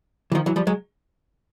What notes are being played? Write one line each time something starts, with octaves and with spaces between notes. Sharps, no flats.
E3
D#3 F3
E3 F#3
F3 G3
F#3 G#3